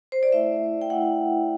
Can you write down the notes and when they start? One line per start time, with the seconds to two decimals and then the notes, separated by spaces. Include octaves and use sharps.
0.12 C5
0.23 D5
0.32 A3 E4 E5
0.81 G5
0.90 A3 E4 F#5